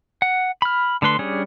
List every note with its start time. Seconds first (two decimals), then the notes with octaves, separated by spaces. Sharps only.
0.22 F#5
0.62 B5 F6
1.02 D3 A3 B4 C6
1.19 G3 C#4 D4 G#4